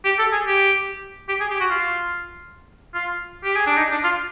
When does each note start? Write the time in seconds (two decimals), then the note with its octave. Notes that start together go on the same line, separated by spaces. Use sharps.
0.05 G4
0.19 A4
0.32 G#4
0.47 G4
1.29 G4
1.40 G#4
1.51 G4
1.60 F#4
1.71 F4
2.94 F4
3.44 G4
3.56 G#4
3.67 D4
3.77 D#4
3.91 D4
4.04 F4